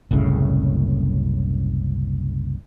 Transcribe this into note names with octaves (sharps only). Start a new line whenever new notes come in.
F#1 C2 A2 C#3